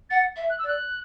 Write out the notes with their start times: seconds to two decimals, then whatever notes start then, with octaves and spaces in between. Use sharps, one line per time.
0.10 F#5 A6
0.36 E5
0.50 F#6
0.59 E6
0.63 D5
0.68 F#6